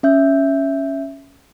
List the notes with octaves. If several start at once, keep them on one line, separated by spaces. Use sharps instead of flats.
C#4 E5 G6